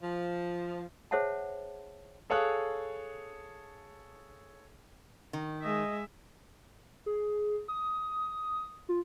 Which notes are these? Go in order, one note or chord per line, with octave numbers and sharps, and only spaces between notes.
F3
G#4 C5 C#5 E5 F#5 A5
G#4 A4 C#5 F5 D#6 F#6
D#3
G#3 D#5 E5
G#4
D#6
F4